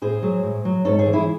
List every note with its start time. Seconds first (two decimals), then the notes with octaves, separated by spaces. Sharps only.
0.02 A2 G#4 C5
0.23 F#3
0.43 A2
0.65 F#3
0.85 G#2 A4 C#5
0.99 G#4 C5
1.06 E3
1.13 E4 G#4